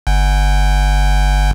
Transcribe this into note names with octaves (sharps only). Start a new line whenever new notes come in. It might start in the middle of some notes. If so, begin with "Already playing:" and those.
G1